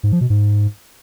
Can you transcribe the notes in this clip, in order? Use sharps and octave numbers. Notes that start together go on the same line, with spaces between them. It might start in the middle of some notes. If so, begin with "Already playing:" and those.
G#2
F3
B2
G#2